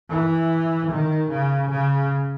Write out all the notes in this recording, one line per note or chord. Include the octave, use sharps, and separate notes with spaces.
E3
D#3
C#3
C#3